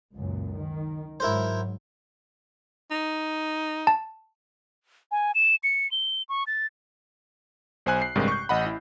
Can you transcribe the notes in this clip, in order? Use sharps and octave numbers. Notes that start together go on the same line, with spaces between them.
C#2 F#2 A#2
D#3
G#2 F#3 E4 A#4 C5
D#4
A5
G#5
E7
C#7
G7
C#6
A6
B1 C5 G#5 F#6
C7
A1 G2 C3 G#3 G4 A#4
C#6 G6
A1 D#5 F#5 B5
E4